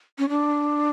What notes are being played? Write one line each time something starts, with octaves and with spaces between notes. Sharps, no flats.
C#4
D4